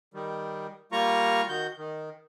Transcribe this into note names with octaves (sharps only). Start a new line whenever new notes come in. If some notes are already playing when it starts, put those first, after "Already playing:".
D#3 G3
G3 A#3 F4 A#5 C#6
D#3 F#4 G6
D#3